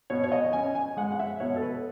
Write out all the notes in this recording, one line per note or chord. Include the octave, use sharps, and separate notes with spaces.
B2 C#5
C#5
D#5
C#4 G#5
G#5
G#3 F#5
F#5
E5
B2 C#5
A4
B4